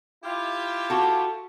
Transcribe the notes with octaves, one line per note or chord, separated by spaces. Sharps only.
E4 F4 G4
F#4 A4